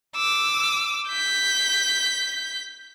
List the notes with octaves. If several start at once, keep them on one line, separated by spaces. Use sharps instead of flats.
D6 E6
G6 B6